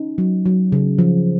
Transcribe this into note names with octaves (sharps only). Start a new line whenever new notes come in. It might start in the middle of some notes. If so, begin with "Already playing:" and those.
Already playing: C#4 D#4
F#3
F#3
C#3
F3